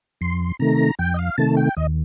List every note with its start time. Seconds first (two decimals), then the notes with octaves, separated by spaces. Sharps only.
0.21 F2 C6
0.59 C3 D#3 A3 A#5
0.99 F2 G5
1.14 D#5
1.19 F5
1.38 C3 D#3 A3 A5
1.57 G5
1.77 D#2 D#5